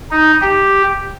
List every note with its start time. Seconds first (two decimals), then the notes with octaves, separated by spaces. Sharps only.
0.11 D#4
0.41 G4